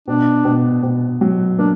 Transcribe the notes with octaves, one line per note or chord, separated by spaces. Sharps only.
B2 D4
B2
B2
F#3
A#3 D4